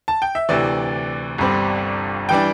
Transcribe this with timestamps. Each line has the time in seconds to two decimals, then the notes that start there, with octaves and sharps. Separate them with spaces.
0.08 A5
0.22 G5
0.35 E5
0.49 D2 C3 E3 D5
1.38 G1 G2 G3 C4
2.29 E3 G3 D4 G5